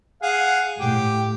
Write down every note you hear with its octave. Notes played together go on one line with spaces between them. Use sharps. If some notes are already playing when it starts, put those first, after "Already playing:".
G#4 F5 F#5
A2 G4